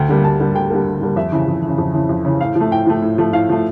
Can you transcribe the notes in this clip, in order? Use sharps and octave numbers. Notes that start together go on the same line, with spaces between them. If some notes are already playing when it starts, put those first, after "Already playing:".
Already playing: D2 G5
D3 G3 A#3
D2 A5
D3 G3 A#3
D2 G5
D3 G3 A#3
D2
D3 G3 A#3
F2 E5
C#3 E3
F2
E3
C#3
F2
C#3 E3
F2
C#3 E3
A2 F5
F3 A3
A2 G5
F3 A3
A2
F3 A3
A2 F5
F3 A3